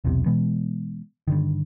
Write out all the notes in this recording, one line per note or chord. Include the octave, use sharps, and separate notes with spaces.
E1 B1 E2 C3
B2 E3 G#3 B3
G2 D3 D#3